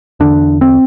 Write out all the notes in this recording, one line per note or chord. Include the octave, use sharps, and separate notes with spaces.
E2 D3 D4
C4